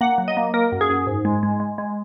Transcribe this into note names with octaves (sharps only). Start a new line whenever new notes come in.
A#3 F#5
F#3
D#5
A#3
A#3 A#4
F#2
G#4
F#2
G#2
G#3
G#3
G#3
G#3